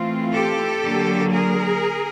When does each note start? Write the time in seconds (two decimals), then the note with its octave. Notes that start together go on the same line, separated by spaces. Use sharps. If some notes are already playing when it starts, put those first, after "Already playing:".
Already playing: E3 A3 C4 F4
0.34 G4 A4
0.83 D3 F#3 A#3
1.32 G#4 A#4